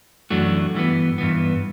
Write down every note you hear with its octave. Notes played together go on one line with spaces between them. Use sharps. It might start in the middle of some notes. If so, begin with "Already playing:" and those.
F#2 E3 A3 D4 F#4
G2 E3 B3
G2 E3 B3